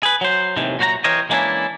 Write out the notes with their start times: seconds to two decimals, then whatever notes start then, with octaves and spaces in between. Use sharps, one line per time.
0.03 G#4 B4
0.21 F#3 C5
0.56 D#2 A2 C3 D#3 E3
0.79 A#2 F#3 F#4 C5 F#5 A#5
1.04 E3 G4 A#4 C5 C#5 D#5
1.29 E3 G#3 A#3 C#4 D4 E4